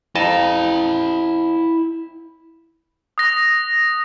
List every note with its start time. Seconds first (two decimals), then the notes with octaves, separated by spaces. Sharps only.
0.15 F2 E4 D#5 A5 A#5
3.18 D#6 F#6 A#6